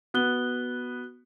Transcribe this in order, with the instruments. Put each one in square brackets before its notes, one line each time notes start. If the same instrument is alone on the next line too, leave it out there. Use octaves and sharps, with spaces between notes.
[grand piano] B3 [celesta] F#4 F#6 G7